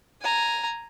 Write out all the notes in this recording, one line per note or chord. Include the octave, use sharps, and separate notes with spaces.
G#5 A#5